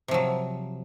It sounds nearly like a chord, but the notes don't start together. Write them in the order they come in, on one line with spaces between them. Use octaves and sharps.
C3 F3 F#3